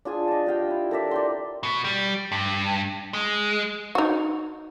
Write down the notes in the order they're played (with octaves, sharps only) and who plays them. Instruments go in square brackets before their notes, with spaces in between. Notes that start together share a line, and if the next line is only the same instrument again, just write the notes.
[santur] D4 F4 G#4 G#5
D#5 A5
D4 G4 F5 G5
E4 E5
A4 A#4 D5 E5
D5 G5 C6
[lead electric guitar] B2
G3
G2
G#3
[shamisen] D#4 F#4